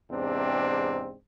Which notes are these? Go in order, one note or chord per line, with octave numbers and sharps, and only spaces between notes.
E2 G#2 C3 C4 D4